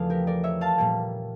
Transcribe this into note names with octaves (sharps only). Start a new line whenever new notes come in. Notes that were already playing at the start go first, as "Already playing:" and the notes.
Already playing: E2 C#3 F3 A3 D5 F5
G4 A#4
A#4 D5
C#5 E5
F5 A5
A#2 G3 A#3